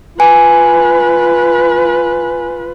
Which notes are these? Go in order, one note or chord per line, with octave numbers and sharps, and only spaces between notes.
F4 B4 G#5